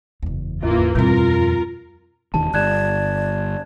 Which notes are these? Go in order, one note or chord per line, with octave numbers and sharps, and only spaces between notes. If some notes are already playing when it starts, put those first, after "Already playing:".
F#1 E2
D#2 G#2 E3 A#3 F4
F2 B2 G3 C4 F4 A#4
E1 D#2 D#3 A5
G1 D5 F#6 G#6 E7